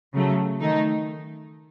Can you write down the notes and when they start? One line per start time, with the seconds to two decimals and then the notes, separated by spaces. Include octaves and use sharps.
0.14 C#3 F#3 A3
0.60 D#3 A3 D#4